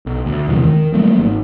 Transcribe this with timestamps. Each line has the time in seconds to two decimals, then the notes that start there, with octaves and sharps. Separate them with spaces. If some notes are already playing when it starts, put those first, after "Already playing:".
0.06 B1
0.26 D2
0.48 E2 C3 F3 G#3
0.64 D#3
0.94 F#3 G3 A3 A#3
1.18 G#1